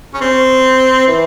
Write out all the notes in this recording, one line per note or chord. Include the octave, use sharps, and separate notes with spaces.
C#4
C4
E3